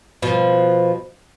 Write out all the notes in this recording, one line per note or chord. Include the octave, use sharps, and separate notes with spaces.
B2 F3